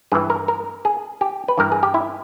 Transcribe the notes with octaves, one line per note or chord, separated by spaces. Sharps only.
G2 E3 G#4
A#4
A#4
G#4
G4
B4
G2 E3 A#4
G#4
G4
E4